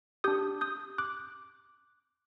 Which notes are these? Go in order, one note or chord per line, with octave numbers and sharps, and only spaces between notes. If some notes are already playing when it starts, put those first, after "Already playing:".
D4 G4 D#6 G6
D#6 G6
D6 F#6